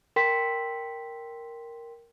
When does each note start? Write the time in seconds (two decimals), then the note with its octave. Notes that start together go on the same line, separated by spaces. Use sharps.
0.16 A#4 G5 C6 B6